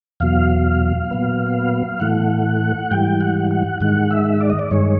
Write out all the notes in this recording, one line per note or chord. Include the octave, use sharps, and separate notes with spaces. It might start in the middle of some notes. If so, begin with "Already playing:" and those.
E2 B2 F#3 F5
A#2 F#3 B3
A2 E3 A3 F#5
G#2 E3 G3 G5
F#5
F#5
G#2 D#3 G#3 F#5
E5
D5
D#5
D5
G2 D#3 G#3 C#5